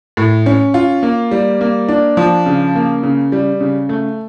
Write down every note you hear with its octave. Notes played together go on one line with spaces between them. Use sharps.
A2
C#4
F4
A#3
G3
A#3
D4
F3
C#3
A#3
C#3
G3
C#3
A3